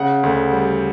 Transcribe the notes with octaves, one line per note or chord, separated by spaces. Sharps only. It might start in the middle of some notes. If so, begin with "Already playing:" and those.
Already playing: C#3 F#5
D2
G3